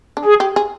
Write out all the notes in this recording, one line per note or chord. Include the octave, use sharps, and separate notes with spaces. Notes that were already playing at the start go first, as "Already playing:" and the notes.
D4
G#4
G4
G#4